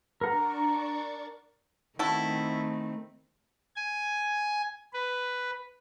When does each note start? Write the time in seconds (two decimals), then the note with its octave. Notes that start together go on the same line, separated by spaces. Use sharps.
0.21 D4 A#4 D5 F#5 A#5 C#6
1.99 D#3 A3 C4 E4 F#4 A4
3.76 G#5
4.93 B4